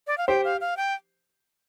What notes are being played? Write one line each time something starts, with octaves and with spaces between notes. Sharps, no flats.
D5
F5
G4 C5 G5
F5
F5
G5